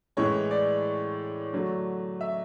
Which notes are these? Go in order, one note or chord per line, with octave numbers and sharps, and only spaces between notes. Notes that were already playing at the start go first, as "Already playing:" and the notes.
A2 E3 G#3 C#5
D5
D3 F#3 A3
E5